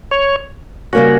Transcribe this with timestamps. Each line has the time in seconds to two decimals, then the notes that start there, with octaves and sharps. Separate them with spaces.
0.11 C#5
0.93 C#3 G3 A#3 C#4 F#4